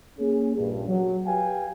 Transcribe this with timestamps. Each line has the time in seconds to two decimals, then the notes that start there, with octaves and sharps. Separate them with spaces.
0.19 A#3 C#4 G#4
0.57 A#1 G2
0.88 F#3
1.27 G4 B4 F5 G5 G#5